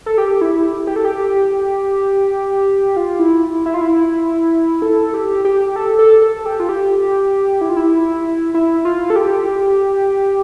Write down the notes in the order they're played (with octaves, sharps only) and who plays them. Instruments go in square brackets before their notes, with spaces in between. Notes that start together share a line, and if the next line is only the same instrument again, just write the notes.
[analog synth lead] A4
G4
E4
G4
A4
G4
F4
E4
E4
F4
E4
A4
G4
G4
A4
A4
A4
G4
F4
G4
E4
F4
E4
E4
F4
A4
G4